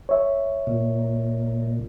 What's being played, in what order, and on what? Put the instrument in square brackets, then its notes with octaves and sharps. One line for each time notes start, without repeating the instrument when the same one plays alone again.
[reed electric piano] C#5 E5
[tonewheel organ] A#2